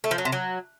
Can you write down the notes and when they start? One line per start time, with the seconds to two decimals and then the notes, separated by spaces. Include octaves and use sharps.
0.04 A3
0.11 F3
0.18 F#3
0.25 C3
0.32 F#3